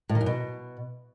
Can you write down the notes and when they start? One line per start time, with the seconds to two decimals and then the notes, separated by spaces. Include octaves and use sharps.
0.09 A2
0.15 D#3
0.21 F#2
0.26 B2